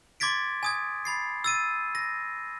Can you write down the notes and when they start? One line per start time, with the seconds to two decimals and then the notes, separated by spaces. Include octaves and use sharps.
0.20 C6 D6 G#6 A6 B6 D7
0.63 G#5 D#6 G#6
1.05 B5 A6 C7
1.44 E6 A6 D#7
1.95 A#6